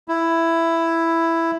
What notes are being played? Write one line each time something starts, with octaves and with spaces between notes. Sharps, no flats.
E4